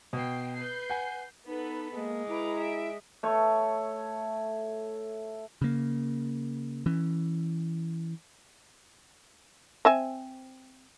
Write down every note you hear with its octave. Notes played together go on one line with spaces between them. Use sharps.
B2 G5 C7
B4 G6 C7
F#5 G#5
B3 D#4 A4 B4
G#3 A#3
E4 B4 A#5 D6
E5 D7
A3 C#5
C#3 A#3
E3 C#4
C4 E5 G#5